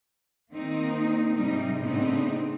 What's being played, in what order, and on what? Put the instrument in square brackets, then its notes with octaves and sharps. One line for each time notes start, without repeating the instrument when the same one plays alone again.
[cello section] D#3 A#3 C4 D#4
G#2 C3 G3 D#4
A2 C#3 B3 C4 D4 D#4